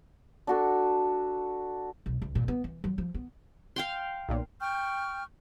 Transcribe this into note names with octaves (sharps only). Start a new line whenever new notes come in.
D4 F#4 A4
B1
C#2
A#2
B3
E3
F#3
F3
B3
F5 G5 C6
B1 A#2
G5 C#6 F6 G6